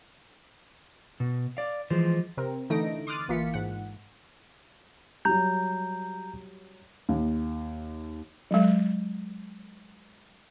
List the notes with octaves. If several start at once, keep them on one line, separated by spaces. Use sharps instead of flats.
B2
D5 F5
E3 F3 G#3 C5
C3 C4 A#4
D3 E3 A3 D#4 A#6 D7
C6 D6 D#6 F6 F#6 A6
A1 E3 A#3 F4 B6 C#7
G#2 F#5
F#3 G3 A#5 G6
D#2
F#3 G#3